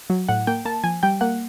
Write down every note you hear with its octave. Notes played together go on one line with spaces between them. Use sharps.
F#3
A2 F#5
A#3 G5
A#3 A5
F3 G#5
G3 G5
A#3 F#5